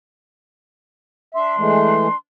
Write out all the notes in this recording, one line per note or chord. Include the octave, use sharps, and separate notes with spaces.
D4 E5 C6
E3 G#3 A3